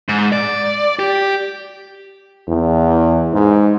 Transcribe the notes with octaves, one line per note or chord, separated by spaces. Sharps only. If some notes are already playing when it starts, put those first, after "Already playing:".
G#2
D5
G4
E2
G#2